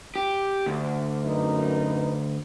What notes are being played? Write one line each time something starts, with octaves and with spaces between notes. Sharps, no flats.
G4
D2
F#2 D#4 B4